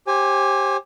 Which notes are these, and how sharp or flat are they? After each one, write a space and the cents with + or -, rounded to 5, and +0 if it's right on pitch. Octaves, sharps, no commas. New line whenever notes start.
G4 +0 C5 +35 G#5 -15